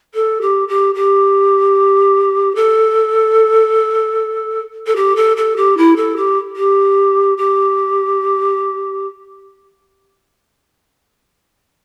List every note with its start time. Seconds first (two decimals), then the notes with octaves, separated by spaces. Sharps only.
0.14 A4
0.41 G4
0.68 G4
0.94 G4
2.55 A4
4.86 A4
4.96 G4
5.16 A4
5.37 A4
5.56 G4
5.77 E4
5.96 A4
6.16 G4
6.56 G4
7.37 G4